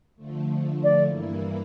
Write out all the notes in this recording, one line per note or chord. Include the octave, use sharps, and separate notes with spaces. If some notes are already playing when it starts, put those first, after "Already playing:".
D3 F3 A3
D5
G2 E3 A#3 E4